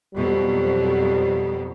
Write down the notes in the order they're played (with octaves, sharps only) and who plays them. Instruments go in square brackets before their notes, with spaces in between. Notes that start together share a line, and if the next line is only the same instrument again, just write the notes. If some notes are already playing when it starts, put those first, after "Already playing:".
[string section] F2 B2 F#3 [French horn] G3